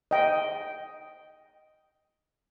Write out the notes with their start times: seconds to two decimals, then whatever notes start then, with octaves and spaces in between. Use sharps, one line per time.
0.11 D#5 G5